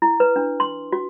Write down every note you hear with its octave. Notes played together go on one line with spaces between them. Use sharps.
E4
B4
D4
C6
F#4